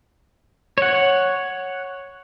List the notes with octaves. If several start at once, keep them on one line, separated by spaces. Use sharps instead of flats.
C#5 F#5